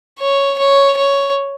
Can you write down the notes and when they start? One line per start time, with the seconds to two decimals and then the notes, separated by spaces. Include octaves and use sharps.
0.19 C#5
0.58 C#5
0.97 C#5